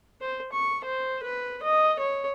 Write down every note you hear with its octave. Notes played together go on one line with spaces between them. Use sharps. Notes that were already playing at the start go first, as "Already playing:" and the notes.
C5
C#6
C5
B4
D#5
C#5